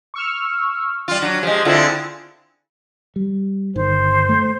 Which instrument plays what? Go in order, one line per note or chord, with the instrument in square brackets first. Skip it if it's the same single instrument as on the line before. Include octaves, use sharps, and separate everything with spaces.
[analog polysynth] C#6 E6 F6
[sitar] G3 F4
[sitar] F#3 [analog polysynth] D4
[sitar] F3 G#3 [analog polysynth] G4
[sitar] D3 C4 [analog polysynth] E4 F4 G#4
[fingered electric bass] G3
[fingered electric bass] G1 D#3 [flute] C5
[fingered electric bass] A3